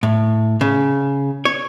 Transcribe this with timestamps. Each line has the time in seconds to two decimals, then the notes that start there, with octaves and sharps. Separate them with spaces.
0.03 A2
0.61 C#3
1.45 C#5